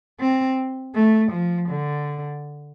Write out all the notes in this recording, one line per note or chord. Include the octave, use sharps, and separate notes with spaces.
C4
A3
F3
D3